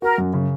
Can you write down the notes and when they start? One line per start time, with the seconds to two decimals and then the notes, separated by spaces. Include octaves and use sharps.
0.02 F#4 A#4
0.18 F#2
0.33 C#3